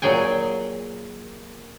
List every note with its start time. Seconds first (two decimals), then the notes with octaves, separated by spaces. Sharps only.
0.02 A#2 F#3 G#4 G5 G#5